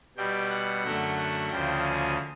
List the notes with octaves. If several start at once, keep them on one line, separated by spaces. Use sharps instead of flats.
B2 G3 G5
F#5
F#2 D3 F#3 A3
F#5
D2 C#3 F3 G5
G#5